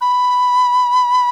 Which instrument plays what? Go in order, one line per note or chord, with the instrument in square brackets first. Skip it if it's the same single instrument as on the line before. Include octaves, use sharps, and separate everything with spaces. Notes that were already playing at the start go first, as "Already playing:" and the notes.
[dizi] B5